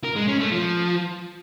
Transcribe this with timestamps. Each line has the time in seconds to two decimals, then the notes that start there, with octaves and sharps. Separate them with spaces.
0.04 A#4
0.16 G#3
0.27 C#4
0.39 A3
0.51 F3